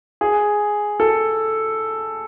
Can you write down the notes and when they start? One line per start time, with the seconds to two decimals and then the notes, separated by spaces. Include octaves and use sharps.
0.21 G#4
1.00 A4